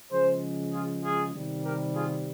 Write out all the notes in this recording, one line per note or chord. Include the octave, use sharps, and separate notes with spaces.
C#3 F3 G#3 G#4 C5
F4 G#4
F4 G#4
C3 D#3 G3
G4 A#4
F4 G#4